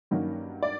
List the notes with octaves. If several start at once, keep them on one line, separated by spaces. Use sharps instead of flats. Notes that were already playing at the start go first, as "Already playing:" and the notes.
G2 D#3 F#3 A#3 C#4
D5